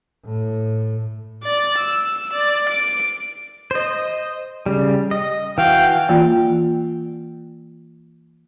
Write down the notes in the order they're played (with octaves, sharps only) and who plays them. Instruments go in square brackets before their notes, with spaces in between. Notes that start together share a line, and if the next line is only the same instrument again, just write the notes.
[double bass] A2
[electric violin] D5
E6
D5
D7
[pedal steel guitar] C5 D#5
C#3 G3
D#5
[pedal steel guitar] E3 F#4 [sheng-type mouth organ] F5 G5
[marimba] E3 A#3 F4 G5